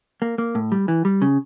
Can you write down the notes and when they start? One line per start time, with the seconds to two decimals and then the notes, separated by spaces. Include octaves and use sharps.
0.22 A#3
0.38 A#3
0.55 A2
0.72 G3
0.88 E3
1.05 G3
1.22 C#3